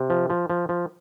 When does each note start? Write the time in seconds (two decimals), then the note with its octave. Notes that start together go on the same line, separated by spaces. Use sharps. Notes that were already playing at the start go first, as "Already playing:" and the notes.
Already playing: C3
0.10 F3
0.30 F3
0.50 F3
0.69 F3